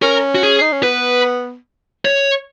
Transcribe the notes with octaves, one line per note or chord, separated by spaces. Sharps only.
C#4 A#4
F#4
G#4
D#4
C#4
B3 B4
C#5